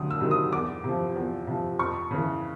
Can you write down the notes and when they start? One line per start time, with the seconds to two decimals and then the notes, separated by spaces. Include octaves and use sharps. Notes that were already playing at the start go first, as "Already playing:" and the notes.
Already playing: D2 C3 F#3 D#6
0.11 E6
0.21 C3 D#3 F#3
0.31 D#6
0.52 E2 D6
0.84 C3 F3
1.16 E2
1.47 C3 F3
1.79 F2 C#6
2.11 C#3 E3